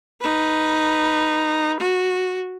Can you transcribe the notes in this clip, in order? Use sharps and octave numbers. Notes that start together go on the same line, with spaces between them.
D#4 B4
F#4